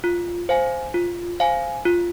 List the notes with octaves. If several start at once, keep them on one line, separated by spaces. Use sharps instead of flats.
F4
C5 F5 G#5
F4
C5 F5 G#5
F4